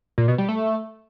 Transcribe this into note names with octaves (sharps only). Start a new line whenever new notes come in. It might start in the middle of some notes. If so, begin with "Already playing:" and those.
A#2
B2
G3
A3